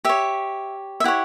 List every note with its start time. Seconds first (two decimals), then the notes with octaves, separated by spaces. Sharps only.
0.05 G4 C#5 E5
1.00 E5
1.04 E4 G4 C#5 F#5